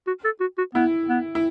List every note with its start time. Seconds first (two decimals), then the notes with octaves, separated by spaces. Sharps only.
0.07 F#4
0.25 A4
0.41 F#4
0.58 F#4
0.75 B3 E4
1.09 B3
1.35 E4